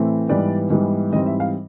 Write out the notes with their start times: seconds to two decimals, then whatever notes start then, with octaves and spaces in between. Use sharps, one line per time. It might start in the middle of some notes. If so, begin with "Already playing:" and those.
Already playing: A2 E3 A3 C4
0.29 G#2 E3 G3 B3 D5
0.70 G#2 E3 G3 B3
1.12 G#2 E3 G3 C4 D#5
1.26 E5
1.40 F5